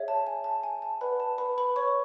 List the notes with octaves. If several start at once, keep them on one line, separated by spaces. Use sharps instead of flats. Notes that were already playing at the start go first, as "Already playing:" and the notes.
Already playing: G#4 C#5 E5
A5
G#5
A5
G#5
A5
B4 D5 F#5 B5
A5
B4 B5
B4 B5
C#5 C#6